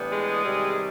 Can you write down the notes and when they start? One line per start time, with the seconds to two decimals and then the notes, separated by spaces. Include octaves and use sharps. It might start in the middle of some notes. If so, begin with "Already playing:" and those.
Already playing: A2 E3 G3 B3 D4
0.12 G#3 G#4
0.44 C3 D#3 G3